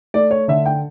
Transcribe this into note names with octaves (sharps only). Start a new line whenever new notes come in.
A3 D5
C#5
D3 E5
G5